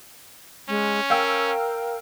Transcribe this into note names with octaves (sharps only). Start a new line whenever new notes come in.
G#3 C#4
A#4 F5 G5 E6